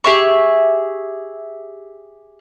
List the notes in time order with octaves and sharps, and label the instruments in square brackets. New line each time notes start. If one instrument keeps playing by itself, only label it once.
[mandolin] G4 G#4 E5 C#6